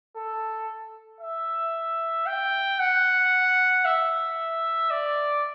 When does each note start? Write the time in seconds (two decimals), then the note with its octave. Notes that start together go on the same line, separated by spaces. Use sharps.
0.16 A4
1.21 E5
2.26 G5
2.79 F#5
3.85 E5
4.91 D5